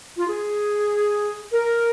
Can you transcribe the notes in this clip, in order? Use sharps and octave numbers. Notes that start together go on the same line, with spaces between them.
F4
G#4
A#4